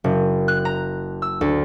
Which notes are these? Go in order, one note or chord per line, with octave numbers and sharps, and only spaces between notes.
F#1
F#6
A#5
E6
D2